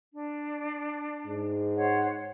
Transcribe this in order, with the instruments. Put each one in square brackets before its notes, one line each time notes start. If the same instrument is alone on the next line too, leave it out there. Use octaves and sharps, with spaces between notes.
[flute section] D4
[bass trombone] G#2
[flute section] C5 C#5 F#5